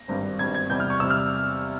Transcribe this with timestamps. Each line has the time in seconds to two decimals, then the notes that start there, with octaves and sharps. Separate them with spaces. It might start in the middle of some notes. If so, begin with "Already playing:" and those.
Already playing: A#6
0.08 G#1 G2 G3 C4
0.39 G#1 G2 G3 C4 G#6
0.54 G#6
0.70 E2 C3 G3 G6
0.80 F6
0.90 C#6
1.00 E2 C3 G3 E6
1.10 F6